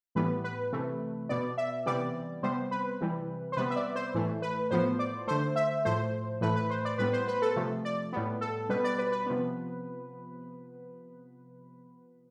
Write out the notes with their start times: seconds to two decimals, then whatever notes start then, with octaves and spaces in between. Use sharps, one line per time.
0.15 A2 E3 G3 B3 B4
0.44 B4
0.72 C3 E3 A3
1.29 B2 B3 D5
1.58 E5
1.86 C3 E3 G3 B3 D5
2.43 C3 G3 B3 C5
2.71 B4
3.01 C3 E3 G3
3.52 C5
3.57 C3 G3 B3 B4
3.71 E5
3.76 D5
3.96 C5
4.14 A2 E3 A3
4.42 B4
4.71 A2 F3 B3 C5
4.99 D5
5.27 D3 A3 C5
5.56 E5
5.85 A2 F3 A3 C5
6.41 A2 E3 A3 B4
6.56 B4
6.70 C5
6.85 D5
6.98 A2 G3 B3 B4
7.13 C5
7.28 B4
7.42 A4
7.56 C3 F3 A3
7.85 D5
8.13 A2 G3 B3
8.41 A4
8.69 B2 G3 B3 B4
8.84 D5
8.99 B4
9.12 B4
9.26 C3 F3 B3